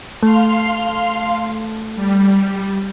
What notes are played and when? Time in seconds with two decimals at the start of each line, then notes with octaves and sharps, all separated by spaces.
0.23 A3 F5 C6 F6
1.95 G3